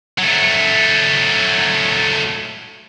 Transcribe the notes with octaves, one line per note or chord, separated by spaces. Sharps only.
F#3 A3